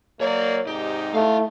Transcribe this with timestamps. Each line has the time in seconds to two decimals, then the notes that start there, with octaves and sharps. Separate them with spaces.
0.21 F#3 A#3 C#5 D5
0.67 G#2 C3 D#4 G4
1.15 A3 E4 F5